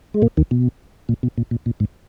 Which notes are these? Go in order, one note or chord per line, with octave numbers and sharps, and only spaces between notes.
G#3
A#2 A#3
D#2 D#3
B2
A#2
B2
A#2
A#2
A#2
G#2